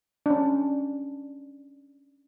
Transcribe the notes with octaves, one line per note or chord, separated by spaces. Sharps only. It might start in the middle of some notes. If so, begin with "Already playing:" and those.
C#4 D4